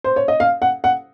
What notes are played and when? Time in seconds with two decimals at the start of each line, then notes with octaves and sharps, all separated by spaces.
0.04 C5
0.16 C#5
0.28 D#5
0.40 F5
0.62 F#5
0.84 F#5